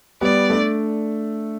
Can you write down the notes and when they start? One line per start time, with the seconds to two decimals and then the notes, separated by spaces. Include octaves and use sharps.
0.21 G3 B3 D5
0.50 A3 D4